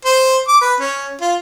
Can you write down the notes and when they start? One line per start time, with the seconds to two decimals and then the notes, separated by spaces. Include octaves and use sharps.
0.05 C5
0.48 D6
0.61 B4
0.80 C#4
1.21 F4